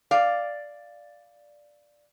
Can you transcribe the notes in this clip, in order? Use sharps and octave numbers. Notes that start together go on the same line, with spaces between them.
D5 F5